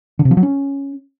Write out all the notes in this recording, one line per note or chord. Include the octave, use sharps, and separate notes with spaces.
D3
C3
F3
F#3
C#4